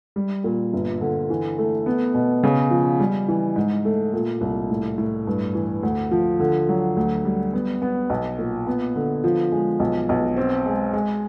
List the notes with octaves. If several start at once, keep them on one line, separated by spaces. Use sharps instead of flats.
G3
A#2
G1
D3
E3
A3
B3
B2
C#3
F3
G3
E3
G#2
A3
A#2
C2
A2
A2
G2
E3
D2
F3
D3
F#3
D2
G3
B3
B3
B1
A#2
B3
D3
F3
G#3
B1
B1
C4
G#3
G#3